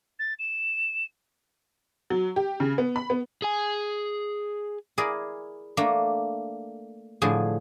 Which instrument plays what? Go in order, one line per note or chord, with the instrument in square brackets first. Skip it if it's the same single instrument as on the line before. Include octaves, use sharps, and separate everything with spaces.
[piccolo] A6
E7
[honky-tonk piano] F#3
G4
C#3
B3
B5
B3
[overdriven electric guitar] G#4 G#5
[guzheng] E4 G#4 A#4 D5
A3 A#3 D4
A2 D3 F3 G#4 A5